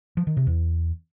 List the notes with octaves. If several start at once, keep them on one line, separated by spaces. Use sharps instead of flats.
F3
D#3
C3
E2